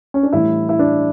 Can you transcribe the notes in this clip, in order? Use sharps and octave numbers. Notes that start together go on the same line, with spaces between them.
C#4
D4
A2 E3 G3 E4
E4
D4